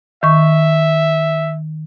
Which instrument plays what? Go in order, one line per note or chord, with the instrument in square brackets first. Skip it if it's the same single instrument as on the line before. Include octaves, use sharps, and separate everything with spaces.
[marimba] D#3 C#6 [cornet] E5